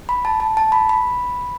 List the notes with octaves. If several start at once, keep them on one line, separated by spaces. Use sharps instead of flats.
B5
A5
A5
A5
B5
B5